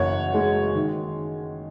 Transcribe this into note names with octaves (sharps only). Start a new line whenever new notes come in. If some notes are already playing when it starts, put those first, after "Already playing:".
Already playing: F#1 F#2 E3 C#5 F#5
G#3
D#3